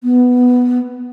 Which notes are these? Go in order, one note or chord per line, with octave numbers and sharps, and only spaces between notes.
B3